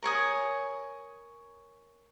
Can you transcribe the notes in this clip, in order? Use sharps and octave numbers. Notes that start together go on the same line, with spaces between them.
A#4 C#5 G#5 D#6